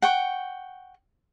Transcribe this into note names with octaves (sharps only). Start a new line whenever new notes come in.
F#5 G5 C#6